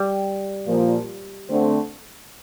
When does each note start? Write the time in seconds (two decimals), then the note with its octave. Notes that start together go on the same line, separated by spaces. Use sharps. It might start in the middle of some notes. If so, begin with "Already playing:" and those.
Already playing: G3
0.67 A#2 F3 A#3
1.49 D3 A3 C4